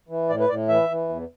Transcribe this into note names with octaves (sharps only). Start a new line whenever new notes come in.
E3
A2 D5
B4
A2 D5
E3 E5
E3
E2